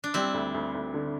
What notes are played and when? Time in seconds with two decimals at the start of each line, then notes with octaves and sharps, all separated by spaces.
0.04 D4
0.14 G3 C4 E4
0.34 D2
0.54 D2
0.74 D2
0.94 D3